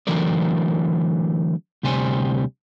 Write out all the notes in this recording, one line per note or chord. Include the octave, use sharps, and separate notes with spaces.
D3 E3 F#3 A3 A#4 D5
D2 C3 G3 C5 G#5